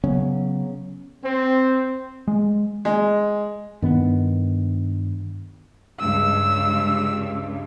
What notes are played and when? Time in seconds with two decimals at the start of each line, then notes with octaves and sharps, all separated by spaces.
0.04 C#3 F#3 B3 C#4
1.23 C4
2.28 G#3
2.85 G#3
3.82 G2 D#3 B3
6.00 C#2 G2 E6